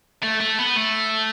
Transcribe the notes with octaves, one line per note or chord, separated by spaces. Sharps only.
A3
A3
B3
A3